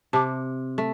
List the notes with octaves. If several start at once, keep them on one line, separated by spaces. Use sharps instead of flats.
C3 A5 D6
A3